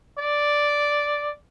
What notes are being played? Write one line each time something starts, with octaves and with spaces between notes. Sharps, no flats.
D5